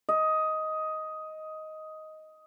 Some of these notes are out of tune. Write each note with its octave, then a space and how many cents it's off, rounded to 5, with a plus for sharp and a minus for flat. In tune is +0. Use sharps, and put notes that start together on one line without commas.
D#5 +10